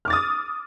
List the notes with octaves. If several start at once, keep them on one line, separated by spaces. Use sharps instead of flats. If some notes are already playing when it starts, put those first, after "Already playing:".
D6 D#6 F6 A6